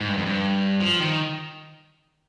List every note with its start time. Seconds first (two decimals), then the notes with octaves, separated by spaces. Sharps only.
0.01 G#2
0.09 G2
0.18 F2
0.26 G2
0.80 F3
1.00 D#3